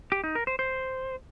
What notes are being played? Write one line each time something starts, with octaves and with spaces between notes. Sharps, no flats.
G4
D#4
A#4
C5
C5